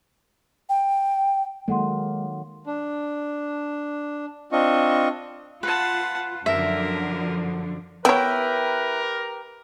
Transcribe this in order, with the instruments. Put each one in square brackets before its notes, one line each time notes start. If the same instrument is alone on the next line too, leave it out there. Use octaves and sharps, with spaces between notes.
[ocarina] G5
[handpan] D#3 F#3 A#3 [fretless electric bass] G#3 [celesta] A4 F#5 C6
[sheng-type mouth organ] D4
C4 D4 F4 D#5 C#6
[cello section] F4 [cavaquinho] B4 [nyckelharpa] F#5 A5
[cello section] F#2 D3 F3 [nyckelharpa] A#4 [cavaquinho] E5
[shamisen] B3 C#5 [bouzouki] E4 G5 [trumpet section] G4 A#4 [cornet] B4